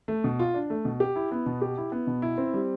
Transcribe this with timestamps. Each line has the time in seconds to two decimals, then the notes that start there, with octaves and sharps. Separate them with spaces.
0.08 A3
0.24 B2
0.39 F4
0.54 D4
0.70 A3
0.85 B2
1.00 G4
1.16 E4
1.31 B3
1.46 B2
1.62 G4
1.77 E4
1.92 B3
2.07 B2
2.22 E4
2.38 C4
2.54 G3